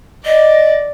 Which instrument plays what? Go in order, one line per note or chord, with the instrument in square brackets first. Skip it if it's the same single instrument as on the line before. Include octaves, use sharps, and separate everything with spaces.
[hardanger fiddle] D5 [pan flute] D#5